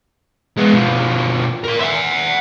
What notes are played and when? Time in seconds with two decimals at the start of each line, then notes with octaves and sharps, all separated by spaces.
0.58 G#3 B3
0.73 B2 F3
1.64 A#4 C6
1.80 E5 F#5